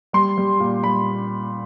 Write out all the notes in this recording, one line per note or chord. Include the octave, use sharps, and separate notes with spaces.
G3 C6
G3
A#2
G3 B5